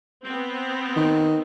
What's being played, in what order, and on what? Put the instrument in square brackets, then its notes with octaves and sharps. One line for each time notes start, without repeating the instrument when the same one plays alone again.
[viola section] B3 C4
[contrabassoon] D#3